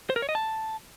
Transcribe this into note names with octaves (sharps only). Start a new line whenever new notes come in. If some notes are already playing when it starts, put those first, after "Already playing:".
C5
A#4
C#5
D#5
A5